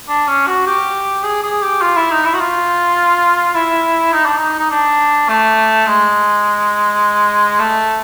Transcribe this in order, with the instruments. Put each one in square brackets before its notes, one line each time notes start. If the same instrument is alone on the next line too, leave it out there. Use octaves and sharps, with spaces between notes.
[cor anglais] D4
C#4
F#4
G4
G#4
G#4
G4
F4
E4
D#4
E4
F#4
F4
E4
D#4
D4
D#4
D#4
D4
A3
G#3
A3